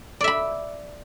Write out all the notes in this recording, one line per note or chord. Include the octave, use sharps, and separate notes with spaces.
D5 E5 B5